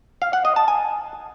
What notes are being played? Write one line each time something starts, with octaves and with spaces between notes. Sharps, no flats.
F5
F#5
D#5
A5
G#5